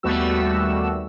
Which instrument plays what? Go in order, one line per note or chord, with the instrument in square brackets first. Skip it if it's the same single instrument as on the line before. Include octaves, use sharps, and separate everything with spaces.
[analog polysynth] D#2 G3 A3 B3 F#4 E6